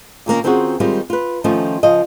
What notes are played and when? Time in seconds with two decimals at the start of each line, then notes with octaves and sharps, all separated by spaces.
0.26 A#2 D#3 A#3 C#4
0.44 D#3 C4 C#4 F4 F#4 G#4
0.80 D#3 G3 G#3 C4 F4
1.10 F4 B4
1.44 D#3 F3 A3 C#4 F4
1.83 C#3 F3 D#5